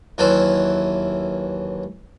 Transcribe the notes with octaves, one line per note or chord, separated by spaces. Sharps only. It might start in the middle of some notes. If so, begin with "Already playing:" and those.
D#2 E3 F#3 A4 C5